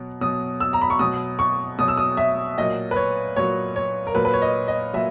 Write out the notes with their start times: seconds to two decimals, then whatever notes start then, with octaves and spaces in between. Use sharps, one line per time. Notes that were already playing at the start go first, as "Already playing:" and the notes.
Already playing: B2 F#3
0.21 B2 F#3 D#6
0.60 E6
0.73 A#5
0.82 B5
0.90 C#6
0.99 B2 F#3 D#6
1.39 C#6
1.78 B2 F#3 D#6
1.88 E6
1.98 D#6
2.17 E5
2.58 A#2 F#3 D#5
2.91 B4
2.96 C#5
3.36 A#2 F#3 C#5
3.76 C#5
4.07 A#4
4.15 A#2 F#3 B4
4.25 B4
4.33 C#5
4.42 D#5
4.68 D#5
4.93 A#2 F#3 E5